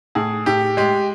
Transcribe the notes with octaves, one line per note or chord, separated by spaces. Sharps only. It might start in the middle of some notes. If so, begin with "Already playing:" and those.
A2 G#4
A2 G4
G#3 G4